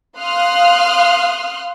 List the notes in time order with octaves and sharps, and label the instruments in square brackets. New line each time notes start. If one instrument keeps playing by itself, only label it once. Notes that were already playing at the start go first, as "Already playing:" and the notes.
[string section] F5 C6 D#6 F6 F#6